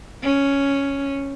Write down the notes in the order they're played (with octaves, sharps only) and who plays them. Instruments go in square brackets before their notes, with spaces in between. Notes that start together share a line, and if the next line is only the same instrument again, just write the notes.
[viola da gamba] C#4